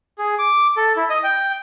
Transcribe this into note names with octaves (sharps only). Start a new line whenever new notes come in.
G#4
D6
A4
E4
D#5
G5